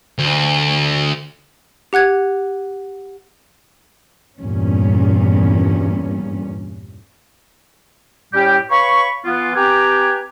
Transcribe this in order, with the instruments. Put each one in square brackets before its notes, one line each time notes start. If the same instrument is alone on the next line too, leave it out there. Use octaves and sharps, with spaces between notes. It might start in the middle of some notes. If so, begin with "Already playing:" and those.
[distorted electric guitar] D2
[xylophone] G4 F#5 F#6 G#6
[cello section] E2 G2 A#2 C#4
[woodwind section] A2 G3 C#4 G4
B4 C#5 F5 B5 C#6
E3 B3 F4
C4 G4 B4 G5 G#5 A#5